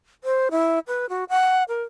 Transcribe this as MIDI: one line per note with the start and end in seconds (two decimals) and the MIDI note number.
0.24 0.49 72
0.51 0.79 64
0.88 1.06 71
1.09 1.24 66
1.29 1.64 78
1.69 1.83 70